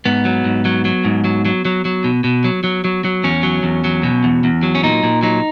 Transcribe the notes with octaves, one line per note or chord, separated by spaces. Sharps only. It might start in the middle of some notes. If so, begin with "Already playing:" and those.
G#2 B3
F#3
G#2
F#3
F#3
G#2
F#3
F#3
F#3
F#3
B2
B2
F#3
F#3
F#3
F#3
E2 C#4
F#3
E2
F#3
B2
E2
E2
F#3
C#4
A#2 D#4
A#2
F#3 D#4